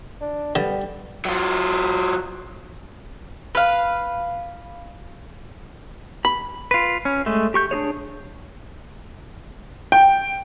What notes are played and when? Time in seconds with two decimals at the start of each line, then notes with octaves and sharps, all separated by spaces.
0.21 D4
0.55 D3 G3 B3
1.25 F#3 F4
3.55 B4 F5
6.25 B5
6.71 F4 B4
7.05 C#4
7.26 G#3 A3
7.54 G4 C#6 G6
7.71 D4 F#4 G#4 C#5
9.92 G5